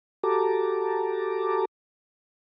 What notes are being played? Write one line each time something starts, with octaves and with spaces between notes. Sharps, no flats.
F#4 G4 A4 A5 A#5 D6